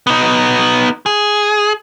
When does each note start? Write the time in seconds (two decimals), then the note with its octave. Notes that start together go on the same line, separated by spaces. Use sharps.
0.07 B3 D#4
1.06 G#4